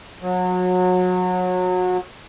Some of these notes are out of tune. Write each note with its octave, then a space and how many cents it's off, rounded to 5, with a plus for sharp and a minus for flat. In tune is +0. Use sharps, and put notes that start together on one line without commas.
F#3 -25